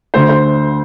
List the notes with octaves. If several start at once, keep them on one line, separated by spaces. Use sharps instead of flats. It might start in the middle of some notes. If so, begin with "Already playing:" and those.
D2 D3 A3 C5
C5